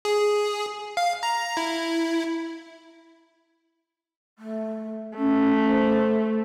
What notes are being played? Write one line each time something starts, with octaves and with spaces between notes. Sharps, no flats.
G#4
F5
A#5
E4
A3
A3 C#4
C5